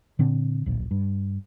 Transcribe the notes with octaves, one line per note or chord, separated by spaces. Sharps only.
A#2 D3 C4
D1 A#1
G2